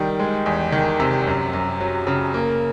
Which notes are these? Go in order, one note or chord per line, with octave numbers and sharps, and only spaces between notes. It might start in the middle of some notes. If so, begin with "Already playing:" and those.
Already playing: D#3 G3
G#3
E2
D#3
C3
F#2
F#2
F#3
C#3
A#3